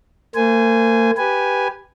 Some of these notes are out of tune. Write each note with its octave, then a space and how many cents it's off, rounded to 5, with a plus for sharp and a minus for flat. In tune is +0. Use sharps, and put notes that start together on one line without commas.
A#3 -45 C5 -35 G#5 +0
G4 +0 B4 +0 G#5 +0